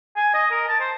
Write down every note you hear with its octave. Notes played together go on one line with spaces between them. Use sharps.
G#5
D#5
A#4
A5
C5